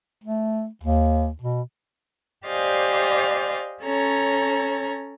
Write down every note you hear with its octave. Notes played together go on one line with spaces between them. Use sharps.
A3
D#2
B2
G4 C5 D5 D#5 F5 G#5
C#4 A4 C#5 A#5